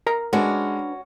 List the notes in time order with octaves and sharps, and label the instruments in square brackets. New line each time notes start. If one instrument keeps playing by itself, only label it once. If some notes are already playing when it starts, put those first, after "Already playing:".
[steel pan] A#4 A#5
[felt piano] G#3 [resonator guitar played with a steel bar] C#4 F#4 [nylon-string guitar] D4 B4 D5